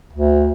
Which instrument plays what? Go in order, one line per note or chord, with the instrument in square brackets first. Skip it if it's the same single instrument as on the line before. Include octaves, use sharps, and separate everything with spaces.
[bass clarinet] D2